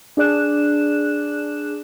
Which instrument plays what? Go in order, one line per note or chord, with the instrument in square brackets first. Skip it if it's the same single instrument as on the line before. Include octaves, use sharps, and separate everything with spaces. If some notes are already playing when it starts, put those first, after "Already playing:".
[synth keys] D4 G#4 D5 F#6 E7